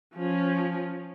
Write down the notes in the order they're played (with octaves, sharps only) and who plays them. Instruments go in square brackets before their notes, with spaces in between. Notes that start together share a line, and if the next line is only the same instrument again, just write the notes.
[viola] F3 C#4